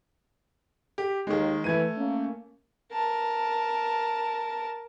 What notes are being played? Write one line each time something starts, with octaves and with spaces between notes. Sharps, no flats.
G4
D#2 D#3 G#3
E3 A3 G#6 D#7
A#3 C#4
A#4 A5